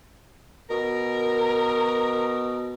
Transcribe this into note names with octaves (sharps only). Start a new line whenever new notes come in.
B2 A#4